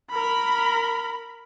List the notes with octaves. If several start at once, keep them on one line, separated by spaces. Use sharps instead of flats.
A#4 B5